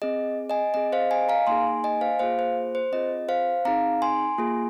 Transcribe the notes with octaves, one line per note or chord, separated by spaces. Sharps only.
C4 G#4 D#5
D#5 G#5
C4 G#4 D#5
C5 F5
D#5 G#5
F5 A#5
A#3 D#4 G#4 G#5 C6
D#5 G#5
C5 F5
A#3 F4 G#4 C5 F5
C5
C5
C4 F4 G#4 D#5
C5 F5
C4 D#4 G#4 F5 A#5
G#5 C6
A#3 F4 G#4